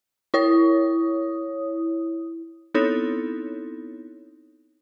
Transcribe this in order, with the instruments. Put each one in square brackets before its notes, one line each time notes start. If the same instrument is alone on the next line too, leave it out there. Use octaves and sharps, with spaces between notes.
[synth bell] E4 C#5 D#6
B3 C4 D#4 E4 A4 C#5